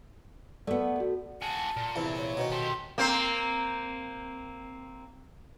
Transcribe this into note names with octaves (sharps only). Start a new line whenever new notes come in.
A3 B3 A4 D5
F#4 A4
F#4 G#4 A5
A#2
E2 C3 E3
C#5
B2 D#3 C#4
G4 A4 C6
A#3 C4 C5